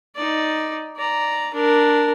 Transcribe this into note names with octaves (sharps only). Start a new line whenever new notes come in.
D#4 D5
D5 A#5
D4 A#4